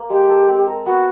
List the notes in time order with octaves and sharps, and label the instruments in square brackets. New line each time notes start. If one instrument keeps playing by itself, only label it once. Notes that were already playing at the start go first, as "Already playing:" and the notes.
Already playing: [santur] A#3
[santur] G#3 [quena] G4
[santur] A4
C4
A#4
[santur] B3 [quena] F#4